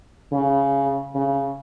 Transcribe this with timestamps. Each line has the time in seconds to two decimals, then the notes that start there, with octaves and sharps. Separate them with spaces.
0.32 C#3
1.15 C#3